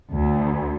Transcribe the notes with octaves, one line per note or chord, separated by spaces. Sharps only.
D2